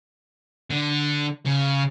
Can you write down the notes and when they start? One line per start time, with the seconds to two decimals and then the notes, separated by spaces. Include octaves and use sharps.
0.70 D3
1.45 C#3